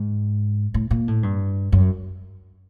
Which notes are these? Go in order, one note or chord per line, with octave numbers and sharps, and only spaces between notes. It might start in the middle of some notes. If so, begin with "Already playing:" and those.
Already playing: G#2
A2
A#2
A2
G2
F#2